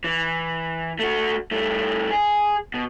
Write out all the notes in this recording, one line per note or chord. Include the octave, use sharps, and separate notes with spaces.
E3
A3 F#4
G2 A3
G#4
B2